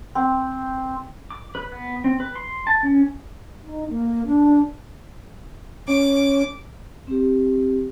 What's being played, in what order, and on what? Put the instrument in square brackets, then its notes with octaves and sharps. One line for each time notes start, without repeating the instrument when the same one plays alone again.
[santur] C4
[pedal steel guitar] D6
B4
B3
C4
B4
C6
A5
C#4
[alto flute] D#4
A#3
D4
[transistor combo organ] C#4 [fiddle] D6
[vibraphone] C4 G4